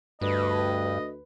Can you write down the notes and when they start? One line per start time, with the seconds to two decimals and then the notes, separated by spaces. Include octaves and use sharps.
0.21 D2 G2 B4 D#5